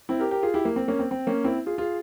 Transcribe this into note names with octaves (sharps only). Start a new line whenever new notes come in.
C4 E4
G4 A#4
G4 A#4
F4 G#4
E4 G4
A#3
C4
A#3 C#4
C4
C4
A#3 C#4
C4 E4
F4 G#4
F4 G#4